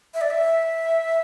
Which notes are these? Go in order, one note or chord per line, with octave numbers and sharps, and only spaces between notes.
E5
D5
E5